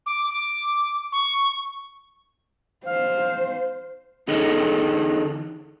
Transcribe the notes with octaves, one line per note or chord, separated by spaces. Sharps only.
D6
D6
C#6
C5 F5
E2 D3 D#4 G#4 A4 D#5